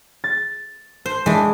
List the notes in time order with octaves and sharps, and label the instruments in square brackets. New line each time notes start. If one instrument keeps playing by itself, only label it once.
[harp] A6
[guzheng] C5
[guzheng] E3 D4 [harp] G#3